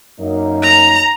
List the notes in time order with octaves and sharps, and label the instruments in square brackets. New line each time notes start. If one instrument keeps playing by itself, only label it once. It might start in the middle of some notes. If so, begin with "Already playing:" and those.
[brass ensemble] F#2 A#3 D#4
[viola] A#5